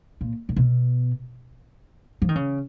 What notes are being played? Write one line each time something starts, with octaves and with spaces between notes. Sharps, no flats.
A#2
A#2
B2
F3
D#3
C#3